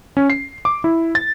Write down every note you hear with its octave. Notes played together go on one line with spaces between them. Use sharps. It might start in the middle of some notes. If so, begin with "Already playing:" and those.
C#4
C7
D6
E4
A6